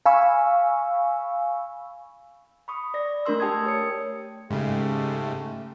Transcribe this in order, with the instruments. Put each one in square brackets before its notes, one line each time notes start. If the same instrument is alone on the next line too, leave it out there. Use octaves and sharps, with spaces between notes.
[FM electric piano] F5 G#5 B5 C#6 E6
[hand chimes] B5 C#6 D#6
D5 A#6
A3 D4 A#4 C6 E6
A3 G4 G5 A5 D#6 G#6
G4 C#5 D#6 C#7
[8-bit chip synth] G#2 C#3 [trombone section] A3 G4